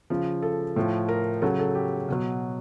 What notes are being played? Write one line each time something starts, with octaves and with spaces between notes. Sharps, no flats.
C#3 F3
A4
A2 F3
A#4
C#3 F#3 A4
A4
G4
B2 F#3